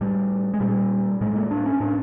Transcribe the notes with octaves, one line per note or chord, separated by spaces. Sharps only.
A2 G3
G#3
A#2 G3
A2 G#3
A#3
D4
C#4
A2 D4